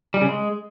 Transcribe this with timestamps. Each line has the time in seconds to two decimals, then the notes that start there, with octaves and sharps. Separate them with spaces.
0.14 G3
0.21 C#3
0.28 G#3